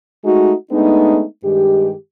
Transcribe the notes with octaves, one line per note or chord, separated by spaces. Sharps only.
G#3 A3 D#4 F#4
G#3 A3 B3 D4 D#4
G2 D#3 G#3 G4